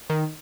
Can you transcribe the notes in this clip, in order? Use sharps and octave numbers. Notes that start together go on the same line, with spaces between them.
D#3